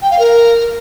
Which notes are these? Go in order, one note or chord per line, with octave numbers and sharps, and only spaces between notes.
G5
F5
A#4